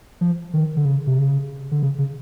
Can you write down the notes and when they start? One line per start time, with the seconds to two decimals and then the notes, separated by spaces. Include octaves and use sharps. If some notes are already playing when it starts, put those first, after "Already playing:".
0.21 F3
0.54 D#3
0.77 D3
0.85 C#3
1.07 C3
1.18 C#3
1.71 D3
1.82 C#3
1.98 C#3